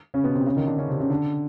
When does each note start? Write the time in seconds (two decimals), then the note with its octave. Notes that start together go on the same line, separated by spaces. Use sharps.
0.14 C#3 C#4
0.24 B2 B3
0.35 C3 C4
0.46 C#3 C#4
0.57 D#3 D#4
0.67 D3 D4
0.78 C#3 C#4
0.89 C3 C4
1.00 C#3 C#4
1.10 D3 D4